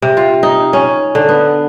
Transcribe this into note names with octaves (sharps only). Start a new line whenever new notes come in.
C3
F4
D#4
C#4
D3
B3